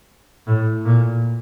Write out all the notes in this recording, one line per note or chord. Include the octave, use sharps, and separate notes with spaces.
A2
A#2